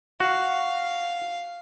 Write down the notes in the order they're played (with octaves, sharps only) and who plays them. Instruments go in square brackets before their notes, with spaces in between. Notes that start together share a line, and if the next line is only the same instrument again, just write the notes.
[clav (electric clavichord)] F#4 [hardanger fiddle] F5